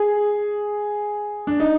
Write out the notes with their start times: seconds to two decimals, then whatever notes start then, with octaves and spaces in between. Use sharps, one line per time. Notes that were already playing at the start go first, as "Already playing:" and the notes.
Already playing: G#4
1.47 D4
1.60 D#4